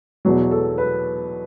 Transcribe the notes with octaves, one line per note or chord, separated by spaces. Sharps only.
E2 B2 F#3 F#4
A4
B4